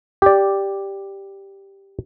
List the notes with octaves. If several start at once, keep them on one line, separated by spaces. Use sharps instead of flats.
G4 D5